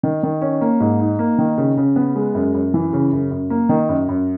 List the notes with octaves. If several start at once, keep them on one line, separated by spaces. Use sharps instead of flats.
D#3
D#3
C#4
A#3
G#2
D#4
A#3
D#3
C#3
C#3
B3
G#3
F#2
F#2
E3
C#3
F#2
F#2
A#3
D#3
F#2
F#2